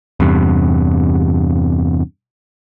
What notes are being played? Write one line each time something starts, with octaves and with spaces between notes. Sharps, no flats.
E2 G2 C3